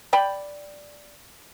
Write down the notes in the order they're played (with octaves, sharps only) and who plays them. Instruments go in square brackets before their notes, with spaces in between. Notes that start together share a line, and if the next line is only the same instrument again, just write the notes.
[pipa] D5 G5 B5